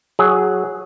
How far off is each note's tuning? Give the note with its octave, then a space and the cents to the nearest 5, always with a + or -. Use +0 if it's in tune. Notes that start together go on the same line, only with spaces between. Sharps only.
F#3 +0 G#4 +0